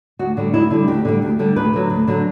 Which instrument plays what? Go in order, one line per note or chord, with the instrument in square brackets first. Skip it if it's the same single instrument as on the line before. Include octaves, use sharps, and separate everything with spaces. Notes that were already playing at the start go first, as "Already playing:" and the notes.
[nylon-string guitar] D2 F#4
D3 G3
D2 E4
D3 G3
D2 G4
D3 G3
D2
D3 G3
D2 B4
D3 F#3
D2
D3 F#3